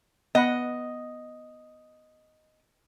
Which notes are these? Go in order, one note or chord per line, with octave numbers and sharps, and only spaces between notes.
B3 D#5 F#5 B5